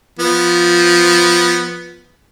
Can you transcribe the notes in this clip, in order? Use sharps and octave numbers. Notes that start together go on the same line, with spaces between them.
F3 B3